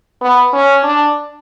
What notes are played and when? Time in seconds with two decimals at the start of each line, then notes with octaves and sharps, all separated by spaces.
0.22 B3
0.53 C#4
0.84 D4